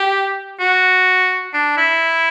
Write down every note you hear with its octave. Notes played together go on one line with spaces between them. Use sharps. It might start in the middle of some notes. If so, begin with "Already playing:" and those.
Already playing: G4
F#4
D4
E4